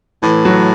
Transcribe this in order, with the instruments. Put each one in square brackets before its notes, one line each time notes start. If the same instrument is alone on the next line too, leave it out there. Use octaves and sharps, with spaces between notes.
[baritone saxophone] A2 [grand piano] E3
[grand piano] F#3